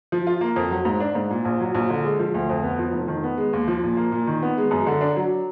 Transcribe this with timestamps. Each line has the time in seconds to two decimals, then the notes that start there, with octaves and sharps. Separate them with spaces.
0.12 F3
0.27 F4
0.41 A#3
0.56 F2
0.71 F#3
0.85 G#2
1.00 D4
1.15 G#2
1.31 A#2
1.45 A#1
1.61 F#3
1.75 A#1
1.90 D3
2.04 G#3
2.19 F3
2.34 D2
2.50 F2
2.63 B3
2.79 F3
2.93 F1
3.08 D#3
3.24 B3
3.38 G#3
3.53 D#2
3.68 F3
3.83 A#2
3.97 A#3
4.12 A#2
4.27 D#3
4.43 B3
4.57 G#3
4.71 F#2
4.87 D3
5.01 D4
5.16 F#3